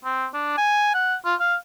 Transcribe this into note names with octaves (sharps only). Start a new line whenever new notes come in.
C4
D4
G#5
F#5
F4
F5